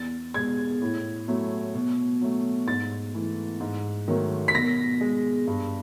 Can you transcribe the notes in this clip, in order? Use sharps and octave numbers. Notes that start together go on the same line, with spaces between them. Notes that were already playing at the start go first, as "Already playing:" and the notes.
Already playing: E2 A6
B2 G#3 G#6
A2
F#3 A3
B2
F#3 A3
G#2 A6
E3 A3
G#2
D#3 F#3 A3
B6
B2 A#6
G#3
G2